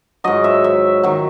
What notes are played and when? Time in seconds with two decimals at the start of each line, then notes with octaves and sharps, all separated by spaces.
0.24 G#2 F#3 D#5
0.44 E5
0.64 E5
1.03 D#3 F#3